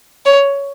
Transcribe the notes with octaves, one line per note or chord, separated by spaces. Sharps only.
C#5